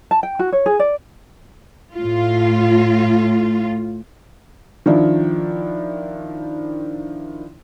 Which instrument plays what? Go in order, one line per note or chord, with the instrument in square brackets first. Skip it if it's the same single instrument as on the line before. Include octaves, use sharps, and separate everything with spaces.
[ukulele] A5
G5
F#4
C#5
G#4
D5
[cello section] A2 F4
[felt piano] D#3 F3 D4 E4